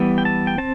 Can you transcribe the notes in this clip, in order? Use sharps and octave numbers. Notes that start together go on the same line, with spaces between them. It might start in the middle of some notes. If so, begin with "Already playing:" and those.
Already playing: E3 G3 B3
G5
A5
G5
C4 A5